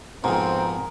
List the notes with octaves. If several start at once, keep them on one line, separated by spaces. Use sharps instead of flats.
F2 G#2 B2 C4 G#4 A#4